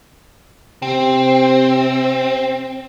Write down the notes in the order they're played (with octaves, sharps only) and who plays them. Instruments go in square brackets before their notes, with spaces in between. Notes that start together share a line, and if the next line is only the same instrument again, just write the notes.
[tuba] C3 [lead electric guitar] C4